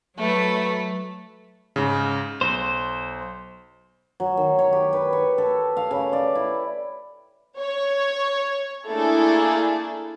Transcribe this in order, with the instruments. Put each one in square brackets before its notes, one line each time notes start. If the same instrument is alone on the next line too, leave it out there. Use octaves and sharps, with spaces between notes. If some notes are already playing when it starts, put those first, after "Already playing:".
[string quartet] F#3 A3 B4
[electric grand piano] G#2 C#3
[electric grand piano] B1 [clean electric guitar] C5
[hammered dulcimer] F#3
D#3
C#5
G4
B4
C#6
A4
F5
C#3
D5
E4
[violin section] C#5
A3 A#3 D4 E4 G#4 A4